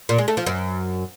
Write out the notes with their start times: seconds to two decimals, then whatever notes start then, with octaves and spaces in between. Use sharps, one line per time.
0.09 A#2
0.18 G#3
0.28 A3
0.37 F3
0.46 F#2